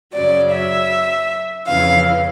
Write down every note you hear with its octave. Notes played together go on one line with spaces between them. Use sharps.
F#2 C#3 F#3 D5
E5
F2 C#3 E3 F5